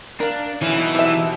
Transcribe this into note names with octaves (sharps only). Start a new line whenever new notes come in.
D4 A#4 F5
B1 E3 C#4 E4
B2 D#4
C3 E5